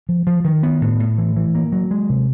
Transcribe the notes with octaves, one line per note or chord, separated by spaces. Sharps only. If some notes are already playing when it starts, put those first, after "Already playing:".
F3
F3
D#3
B3
A2
A2
E3
E3
A#3
F#3
G#3
C3